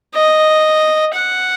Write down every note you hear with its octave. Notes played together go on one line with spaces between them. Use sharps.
D#5
F#5